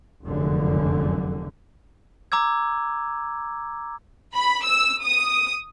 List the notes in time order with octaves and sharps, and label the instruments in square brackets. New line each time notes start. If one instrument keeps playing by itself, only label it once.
[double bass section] F1 C#2 F#2 D3
[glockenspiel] A#5 D6 E6 G#6
[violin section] B5
E6
D#6